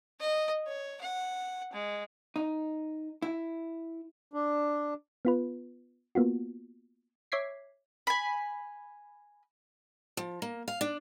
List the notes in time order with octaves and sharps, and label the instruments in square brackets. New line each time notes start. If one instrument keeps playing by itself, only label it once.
[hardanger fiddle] D#5
C#5
F#5
G#3
[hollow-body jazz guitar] D#4
E4
[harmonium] D4
[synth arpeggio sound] B3 F4 B4
A#3 B3 F4 F#4
C#5 E5 D6 G#6 B6 C7
[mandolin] G#5 B5
[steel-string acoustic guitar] F3
A#3
F5
D4